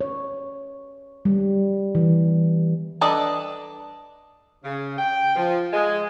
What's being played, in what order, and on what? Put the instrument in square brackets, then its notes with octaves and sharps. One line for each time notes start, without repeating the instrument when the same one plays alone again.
[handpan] C#5
G3
E3
[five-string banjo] D4 A4 B4 D5 D#5
[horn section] C#3
G5
F3
G#3